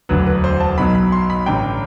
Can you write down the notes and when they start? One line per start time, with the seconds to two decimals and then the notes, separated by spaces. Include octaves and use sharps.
0.09 E1 D2 D3 F#3 B4
0.26 B4
0.44 C5
0.60 A5
0.77 B1 B2 F#3 B5
0.95 B5
1.12 C6
1.30 B5
1.46 A1 G2 D3 G5